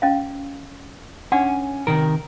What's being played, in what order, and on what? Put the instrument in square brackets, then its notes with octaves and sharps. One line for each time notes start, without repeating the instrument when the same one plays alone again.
[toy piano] C#4 D#5 F5
[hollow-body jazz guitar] C#4 [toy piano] D4 F#5 D6
[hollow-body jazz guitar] C3 D#3 A#4